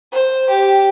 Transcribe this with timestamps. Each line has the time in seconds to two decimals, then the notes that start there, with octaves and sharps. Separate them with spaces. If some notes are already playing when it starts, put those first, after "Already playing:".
0.12 C5
0.49 G4